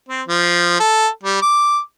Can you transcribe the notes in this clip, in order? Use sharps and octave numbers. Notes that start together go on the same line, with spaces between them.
C4
F3
A4
G3
D6